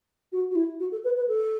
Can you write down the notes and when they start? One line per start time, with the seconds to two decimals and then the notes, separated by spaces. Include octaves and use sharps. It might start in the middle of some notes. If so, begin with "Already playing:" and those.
0.32 F#4
0.51 F#4
0.55 E4
0.80 F#4
0.92 A4
1.04 B4
1.17 B4
1.28 A4